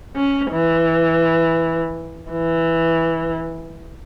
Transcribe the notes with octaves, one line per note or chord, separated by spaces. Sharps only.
C#4
E3
E3